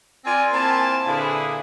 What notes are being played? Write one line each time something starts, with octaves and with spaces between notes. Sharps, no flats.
C4 F4 A#4 D5 G#5
A#3 C4 E4 G#5 A5
A#2 D3 A#3 E4 G#4 B4